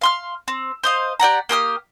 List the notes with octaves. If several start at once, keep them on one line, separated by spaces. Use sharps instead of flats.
F5 C6 F6
C4
C5 D#5 F5
G4 D5 F#5 A#5
A#3 G4 D#6 F6